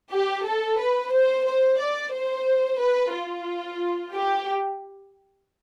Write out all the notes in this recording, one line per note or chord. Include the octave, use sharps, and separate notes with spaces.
G4
A4
B4
C5
C5
D5
C5
B4
F4
G4